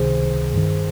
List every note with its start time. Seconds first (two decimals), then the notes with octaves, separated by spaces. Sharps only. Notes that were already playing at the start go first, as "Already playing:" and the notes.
Already playing: C#2 C3 D#3 G#4 C5
0.53 G2 D#3